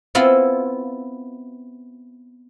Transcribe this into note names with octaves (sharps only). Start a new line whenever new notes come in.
B3 C4 E4 F4